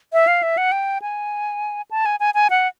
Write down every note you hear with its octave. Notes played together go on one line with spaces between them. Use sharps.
E5
F5
E5
F#5
G5
G#5
A5
G#5
G#5
G#5
F#5